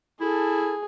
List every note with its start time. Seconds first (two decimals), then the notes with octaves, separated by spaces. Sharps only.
0.20 E4 G#4 A4